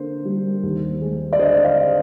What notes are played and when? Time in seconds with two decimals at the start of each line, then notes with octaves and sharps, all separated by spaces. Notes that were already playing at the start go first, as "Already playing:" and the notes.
Already playing: D3 A#3 C5
0.25 G3
0.63 D#2
1.02 G#3
1.33 D5
1.39 D3 C5 D#5
1.64 D5 F5